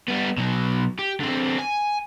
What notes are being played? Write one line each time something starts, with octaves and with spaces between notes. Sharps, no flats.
G3 B3
B2 F#3
G4
D3 C4
G#5